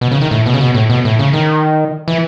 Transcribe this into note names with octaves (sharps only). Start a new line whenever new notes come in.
B2
C#3
D#3
A2
B2
C#3
B2
A2
B2
A2
C#3
D#3
E3